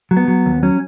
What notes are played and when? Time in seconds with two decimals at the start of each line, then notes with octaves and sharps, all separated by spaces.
0.11 F#3
0.17 B3
0.28 F#3
0.46 D#2
0.63 F#3 C#4